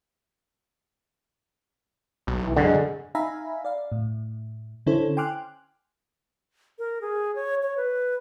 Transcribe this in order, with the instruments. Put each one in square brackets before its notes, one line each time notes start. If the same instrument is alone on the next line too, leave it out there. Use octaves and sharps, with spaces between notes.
[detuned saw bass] B1
[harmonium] E3
[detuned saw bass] F#2 [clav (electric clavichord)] D3 [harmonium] G#3
[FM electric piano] D#4 E5 F5 G#5 A#5 B5
D5 F5
A2
D3 C#4 E4 A4 C5 C#5
G5 G#5 C6 D6 F6 F#6
[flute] A#4
G#4
C#5
C#5
B4